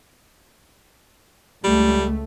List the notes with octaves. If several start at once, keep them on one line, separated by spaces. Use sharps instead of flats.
C#2 G3 A3